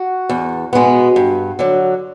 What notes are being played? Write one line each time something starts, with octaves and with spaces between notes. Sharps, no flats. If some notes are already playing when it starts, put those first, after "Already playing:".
Already playing: F#4
E2
B2 G#3 B3
G2
D3 F#3